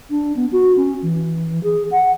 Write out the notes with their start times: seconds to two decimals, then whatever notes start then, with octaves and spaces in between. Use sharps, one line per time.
0.10 D4
0.36 B3
0.52 F#4
0.77 C#4
1.02 E3
1.63 G#4
1.91 F#5